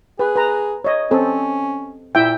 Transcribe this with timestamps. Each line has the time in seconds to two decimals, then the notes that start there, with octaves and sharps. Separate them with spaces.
0.19 G#4 B4
0.36 B4 A#5
0.84 C#5 D#5
1.11 C4 C#4 A4
2.15 A#2 E4 E5 G5